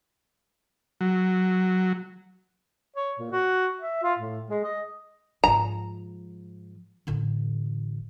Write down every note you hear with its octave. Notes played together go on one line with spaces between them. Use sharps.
F#3
C#5
A#2
F#4
E5
F4
A2
G#3
D#5
G#2 F3 A#5
A1 D3